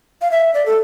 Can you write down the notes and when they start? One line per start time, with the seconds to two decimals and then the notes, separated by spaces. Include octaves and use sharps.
0.21 F5
0.31 E5
0.54 D5
0.66 A4